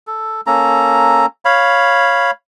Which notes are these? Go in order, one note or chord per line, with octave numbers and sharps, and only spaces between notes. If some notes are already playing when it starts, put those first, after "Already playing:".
A4
A#3 C#4 A4 A#5
C#5 F5 B5